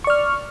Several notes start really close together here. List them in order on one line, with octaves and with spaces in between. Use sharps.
C#6 D5 F6